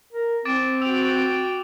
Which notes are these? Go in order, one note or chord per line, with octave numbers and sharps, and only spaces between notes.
A#4
C4 D6 A6 D7
F#4 G5 E6 F7